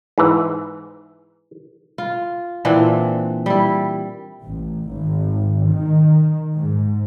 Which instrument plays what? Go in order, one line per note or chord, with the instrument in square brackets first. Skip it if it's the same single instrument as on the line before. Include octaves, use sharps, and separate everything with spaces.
[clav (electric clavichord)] G#2 E3
[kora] F4
A#2 E3 C4 D4
G3 E4
[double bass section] A1
G#1
D#3
G#2